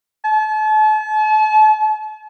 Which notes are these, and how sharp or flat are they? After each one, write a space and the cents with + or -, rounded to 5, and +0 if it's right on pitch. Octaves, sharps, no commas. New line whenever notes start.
A5 -40